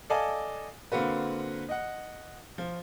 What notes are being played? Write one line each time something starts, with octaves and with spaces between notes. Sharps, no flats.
A4 D5 D#5 F5 G#5 A5
D3 A#3 C4 F#4 B4
D#5 F#5
F3